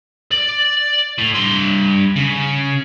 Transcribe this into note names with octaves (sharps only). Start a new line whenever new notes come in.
D5
A2
G2 C6
C#3